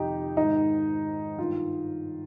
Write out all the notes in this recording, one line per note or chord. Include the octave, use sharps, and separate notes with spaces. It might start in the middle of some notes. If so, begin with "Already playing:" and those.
Already playing: F2 C3 D#3 D#4 G4
G#2 D#3 D#4
G2 D#3 F4